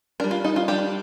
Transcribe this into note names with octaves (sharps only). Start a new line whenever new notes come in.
G3 D4 A#4
F4
D#4
F4
G3 D4 G4